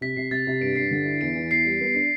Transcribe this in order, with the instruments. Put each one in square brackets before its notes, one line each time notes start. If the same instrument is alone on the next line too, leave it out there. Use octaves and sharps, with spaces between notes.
[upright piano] C3 [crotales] B6
[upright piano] C3 [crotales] C7
[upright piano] C3 [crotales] A6
[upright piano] C3
[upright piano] G2 [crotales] D7
[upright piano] G2 [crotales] C7
[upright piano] D3
E4
[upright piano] E2 [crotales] D7
[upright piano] E3
[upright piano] E2 [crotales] C7
[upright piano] G3
B3
D4